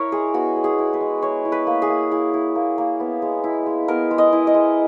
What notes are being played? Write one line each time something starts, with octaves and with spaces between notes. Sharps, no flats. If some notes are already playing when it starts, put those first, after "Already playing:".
Already playing: E4 A#4 C#5
G#3 G#4
B3 F#4
G#3
G#4
E4
B4
G#3
E4 C#5
E4
B4
A#3
G#4
A#3
E4 G#4
E4
A#3
A#3
B3
G#3
E4
G#3
B3 A#4
G#3
D#5
E4
D#5
G#3